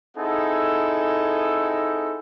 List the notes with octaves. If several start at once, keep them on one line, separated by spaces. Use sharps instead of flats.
C4 D#4 E4 G#4 A4 F#5